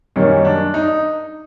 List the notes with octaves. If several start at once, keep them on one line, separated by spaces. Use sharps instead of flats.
F#2 D#3 G3 A#3 C#4
D4
D#4